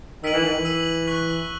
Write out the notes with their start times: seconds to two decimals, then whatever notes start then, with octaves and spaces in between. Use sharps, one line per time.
0.23 D#3 E6 B6 D#7 F#7
0.33 E3
0.44 D#3
0.54 E3
0.65 E6 B6 D#7 F#7
1.07 C#6 F#6 B6